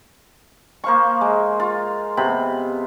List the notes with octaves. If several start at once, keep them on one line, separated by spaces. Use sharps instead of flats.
A#3 C5 F5 C#6
G#3
F4
C3 B3 B5